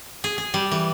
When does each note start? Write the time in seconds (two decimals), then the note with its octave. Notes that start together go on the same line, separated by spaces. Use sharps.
0.24 G#4
0.38 G#4
0.54 G3
0.71 E3